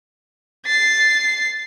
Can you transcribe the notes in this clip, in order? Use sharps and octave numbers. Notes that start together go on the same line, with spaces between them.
A6 C7